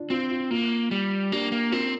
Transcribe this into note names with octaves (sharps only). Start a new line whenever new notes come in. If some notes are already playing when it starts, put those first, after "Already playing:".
Already playing: D4 F4
C4 F4
F4
A#3 F4
G3
A#3 D4 G4
A#3
C4 F4 A#4